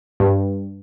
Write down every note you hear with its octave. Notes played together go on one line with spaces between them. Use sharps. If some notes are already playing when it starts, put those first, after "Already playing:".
G2